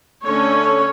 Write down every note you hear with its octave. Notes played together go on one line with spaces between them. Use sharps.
D3 A3 C#4 C#5